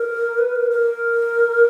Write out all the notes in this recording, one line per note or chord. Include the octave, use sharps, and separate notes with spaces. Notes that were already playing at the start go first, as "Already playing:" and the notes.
Already playing: A#4
B4
A#4
A#4